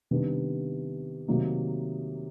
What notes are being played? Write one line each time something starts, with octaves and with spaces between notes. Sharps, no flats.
C3 D#3 G3 B3 D4
C3 D#3 F#3 A#3 D#4